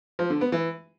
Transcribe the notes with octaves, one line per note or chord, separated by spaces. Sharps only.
F3
D3
B3
E3